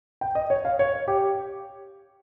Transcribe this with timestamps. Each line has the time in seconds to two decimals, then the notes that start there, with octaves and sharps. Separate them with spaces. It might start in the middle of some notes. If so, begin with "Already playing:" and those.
0.21 G5
0.35 D#5
0.50 C#5
0.65 F5
0.79 C#5
1.08 G4